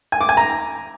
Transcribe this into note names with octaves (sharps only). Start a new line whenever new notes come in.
G#5
D6
G#5
A#5